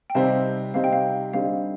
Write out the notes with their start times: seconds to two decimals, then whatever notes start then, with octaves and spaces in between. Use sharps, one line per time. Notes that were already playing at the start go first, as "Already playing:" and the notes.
0.10 G5
0.15 C3 G3 C4 D#4 F5 A5
0.74 C3 G3 C4 D#4 F5
0.84 G5
0.93 F5
1.33 D3 G3 C4 D#4 F5